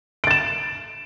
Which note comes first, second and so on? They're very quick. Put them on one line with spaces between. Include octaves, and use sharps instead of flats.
D7 A6 E7